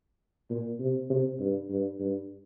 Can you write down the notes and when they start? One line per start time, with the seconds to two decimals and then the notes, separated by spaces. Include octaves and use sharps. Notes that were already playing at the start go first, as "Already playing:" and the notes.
0.50 A#2
0.80 C3
1.10 C3
1.40 G2
1.70 G2
2.00 G2